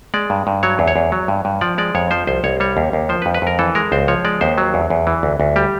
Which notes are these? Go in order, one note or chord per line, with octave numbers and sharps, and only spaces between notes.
G#3 D5
G2
G2
F#3 C#5
E2
C#5
E2
F#3
G2
G2
F3 D5
G#3 D5
F2 C#5
F3 C5
C2 C5
C2 C#5
G3 C#5
D#2
D#2
F3 C5
B4
F2
B4
F2 A#4
E3 A4
G#3 A#4
C#2 C5
F3 C#5
G#3 D5
D#2 C5
F#3
E2
E2
E3
D2
D2
G3 G4